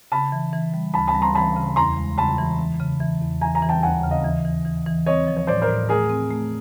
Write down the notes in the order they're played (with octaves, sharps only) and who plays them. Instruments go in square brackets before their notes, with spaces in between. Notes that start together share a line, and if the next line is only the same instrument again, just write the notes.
[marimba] C#3 [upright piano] A5 B5
[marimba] E3
E3
G3
[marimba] D2 [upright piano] A5 B5
[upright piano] A5 B5
[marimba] G3
[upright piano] A#5 C6
[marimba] E3 [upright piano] A5 B5
[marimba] C#3
[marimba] E2 [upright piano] A#5 C6
[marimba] G#3
[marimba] C#3 [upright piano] A5 B5
[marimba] E3
E3
C#3
E3
E2
[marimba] E3 [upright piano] G#5 A#5
[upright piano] G#5 A#5
[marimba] E3
[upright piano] G5 A5
[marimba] D#2 [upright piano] F#5 G#5
[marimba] C#3
[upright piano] D#5 F5
[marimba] E3
E3
E3
E3
[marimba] C4 [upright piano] C#5 D#5
[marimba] F3
[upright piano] C#5
[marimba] A2 [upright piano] C5 D5
[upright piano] A#4 C5
[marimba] A2
[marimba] A3 [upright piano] G#4 A#4
[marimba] C4
A3